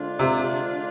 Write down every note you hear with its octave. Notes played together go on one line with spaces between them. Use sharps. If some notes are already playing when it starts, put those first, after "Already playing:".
Already playing: D3 G#3 D4 F4 C5
C3